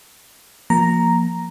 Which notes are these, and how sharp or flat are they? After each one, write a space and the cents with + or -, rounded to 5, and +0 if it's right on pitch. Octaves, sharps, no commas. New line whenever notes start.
F3 +0 A#3 +0 A#5 +0